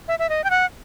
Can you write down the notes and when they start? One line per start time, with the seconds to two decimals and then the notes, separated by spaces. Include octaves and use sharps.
0.08 E5
0.19 E5
0.29 D#5
0.44 G5
0.50 F#5